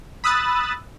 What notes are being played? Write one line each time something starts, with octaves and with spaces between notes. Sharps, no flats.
B5 D#6 E6 F#6 A6